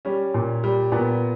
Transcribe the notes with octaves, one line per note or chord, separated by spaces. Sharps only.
G3 C#4
A#2
G3
A#2 B3